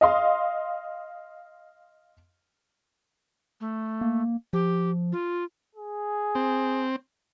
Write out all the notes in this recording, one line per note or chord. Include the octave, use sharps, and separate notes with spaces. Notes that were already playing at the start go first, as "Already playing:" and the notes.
D#5 F5 C6
A3
A#3
F3 G4
F4
G#4
C4